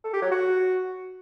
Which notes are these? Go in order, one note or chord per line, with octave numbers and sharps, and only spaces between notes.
A4
G4
F#3
F#4